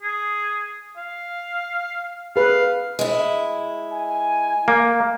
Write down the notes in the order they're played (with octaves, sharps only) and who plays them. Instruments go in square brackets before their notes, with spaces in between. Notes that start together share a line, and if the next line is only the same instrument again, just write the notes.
[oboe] G#4
F5
[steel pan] G#4 B4 [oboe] F5
[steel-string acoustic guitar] G#3 E4
[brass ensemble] G#5
[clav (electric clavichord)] A#3